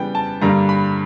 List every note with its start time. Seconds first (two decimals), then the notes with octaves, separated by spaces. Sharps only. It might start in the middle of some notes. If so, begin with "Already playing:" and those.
Already playing: C#3 E3 G3 B3 G5
0.15 A5
0.41 G2 D3 G3 A#3 A#5
0.69 B5